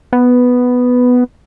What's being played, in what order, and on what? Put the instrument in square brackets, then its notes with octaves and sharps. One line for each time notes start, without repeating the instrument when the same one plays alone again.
[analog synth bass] B3